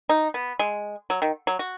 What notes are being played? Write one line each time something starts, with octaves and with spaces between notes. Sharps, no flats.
D#4
B3
G#3
F#3
D#3
F#3
F#4